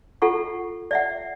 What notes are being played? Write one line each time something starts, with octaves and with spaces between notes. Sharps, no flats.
F4 A4 F#5 C#6
D5 E5 F#5